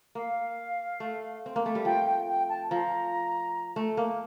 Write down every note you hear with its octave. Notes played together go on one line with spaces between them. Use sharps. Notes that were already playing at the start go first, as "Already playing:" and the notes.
A#3 F5
A3
C4
A#3
A3
G3
F3 G5
G5
G5
A5
F3 A#5
A3
A#3